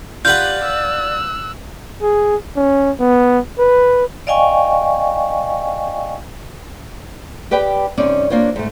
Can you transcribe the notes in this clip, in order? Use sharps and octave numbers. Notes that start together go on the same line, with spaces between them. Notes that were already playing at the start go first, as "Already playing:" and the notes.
F4 G4 B4 D5 F#5 G6
E6 F#6
G#4
C#4
B3
B4
D5 D#5 F5 G5 G#5 C#6
G4 B4 D5 G5
G2 C3 C#4 D#4 D5
A#3 D4 F4 C5 C#5
G#2 A3